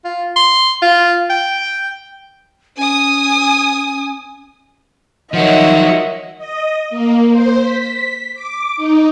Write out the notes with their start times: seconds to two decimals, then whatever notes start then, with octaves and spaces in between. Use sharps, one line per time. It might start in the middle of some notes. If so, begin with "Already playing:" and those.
0.05 F4
0.36 C6
0.82 F4
1.30 G5
2.77 C#4 G#5 D#6
5.33 D#3 F3 F#3 C#5 D#5 E5 F#5
6.38 D#5
6.90 A#3
7.31 C5
7.62 B6
8.34 D6
8.77 D#4